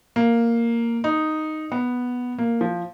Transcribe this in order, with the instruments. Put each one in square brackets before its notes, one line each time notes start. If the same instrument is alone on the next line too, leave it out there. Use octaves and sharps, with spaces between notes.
[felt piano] A#3
D#4
B3
A#3
F3